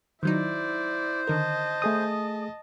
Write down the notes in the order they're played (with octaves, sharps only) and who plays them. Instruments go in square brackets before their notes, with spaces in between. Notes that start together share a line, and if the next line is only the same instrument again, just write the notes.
[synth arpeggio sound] D#3 F#3 D#4 [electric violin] E4 D5 [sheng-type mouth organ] C5
[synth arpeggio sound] D3 D#3 A#4 [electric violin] D#5 A5
[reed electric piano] A3 G#4 D#6